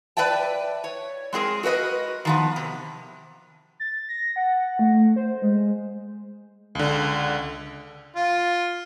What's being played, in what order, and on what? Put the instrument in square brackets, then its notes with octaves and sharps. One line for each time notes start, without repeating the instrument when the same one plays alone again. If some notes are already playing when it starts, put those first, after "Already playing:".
[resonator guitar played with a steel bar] B4 D5 E5 G5 A5
C#5
G#3 C4 G#4 A#4
F#4 A#4 B4 D#5
D#3 F3 B3
C3
[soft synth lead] A6
A#6
F#5
A3
C5
G#3
[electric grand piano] C#2 D3
[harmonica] F4